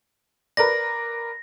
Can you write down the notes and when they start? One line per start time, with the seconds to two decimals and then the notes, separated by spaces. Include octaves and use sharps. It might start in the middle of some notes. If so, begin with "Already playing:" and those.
0.57 A#4 B4 D5 A#6